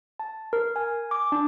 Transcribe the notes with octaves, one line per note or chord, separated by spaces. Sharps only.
A5
A#4
G#5
D6
D4